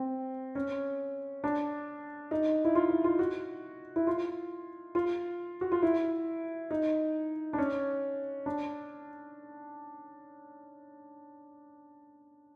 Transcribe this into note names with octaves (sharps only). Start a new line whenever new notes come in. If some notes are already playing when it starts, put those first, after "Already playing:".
Already playing: C4
C#4
D4
D#4
E4
F4
E4
F4
F#4
E4
F4
F4
F#4
F4
E4
D#4
D4
C#4
D4